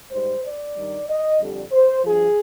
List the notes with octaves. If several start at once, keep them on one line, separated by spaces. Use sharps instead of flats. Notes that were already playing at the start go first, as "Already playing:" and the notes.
G#2 G3 C5
D5
G2 D#3 G3
D#5
F2 D3 G3
C5
G2 F3 G#4